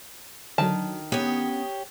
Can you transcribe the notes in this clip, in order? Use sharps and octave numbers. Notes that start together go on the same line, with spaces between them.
D3 D#3 F#3 A5
B3 C#4 D4 G4 C#5 D#6